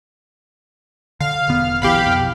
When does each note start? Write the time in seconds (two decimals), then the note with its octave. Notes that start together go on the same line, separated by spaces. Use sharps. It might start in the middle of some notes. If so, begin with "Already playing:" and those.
1.20 D3 F5
1.48 E1 D3 B3
1.82 B1 B2 E3 G4 F5 B5
2.06 F2 B2